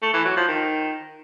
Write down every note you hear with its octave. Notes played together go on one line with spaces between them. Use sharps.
A3
E3
F#3
F3
D#3